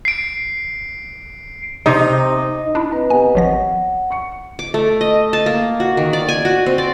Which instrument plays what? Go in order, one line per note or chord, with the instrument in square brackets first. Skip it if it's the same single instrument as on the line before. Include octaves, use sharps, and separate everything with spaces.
[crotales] C7 D7
[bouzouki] C3 [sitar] D#4
[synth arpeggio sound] D4 E4
[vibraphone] C4 B4 D#5 [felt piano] A#5
[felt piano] B3 G4 [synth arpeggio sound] G#5
[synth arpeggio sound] G#1 F3 A#6 [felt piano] C#5 [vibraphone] F#5
[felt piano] C#6 C#7
[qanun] D6
A3
D#5
A5
A#3
F#4
D#3
D5
G#5
F#4
C4
D5